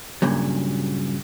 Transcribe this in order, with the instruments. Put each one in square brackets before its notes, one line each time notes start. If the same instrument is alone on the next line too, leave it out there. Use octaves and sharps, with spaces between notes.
[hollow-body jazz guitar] G2 A#2 C#3 F#3